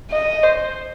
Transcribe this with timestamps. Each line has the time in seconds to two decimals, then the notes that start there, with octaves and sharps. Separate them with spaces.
0.11 D#5
0.43 C5